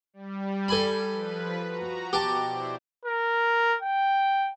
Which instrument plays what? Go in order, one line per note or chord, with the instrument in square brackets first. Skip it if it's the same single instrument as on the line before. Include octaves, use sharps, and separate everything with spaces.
[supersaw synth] G3
[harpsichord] A4 G#5 B5
[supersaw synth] F3 B4
F#4 A#5
[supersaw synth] B2 [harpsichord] G4 A5
[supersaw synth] E4 C5 D5
[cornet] A#4
G5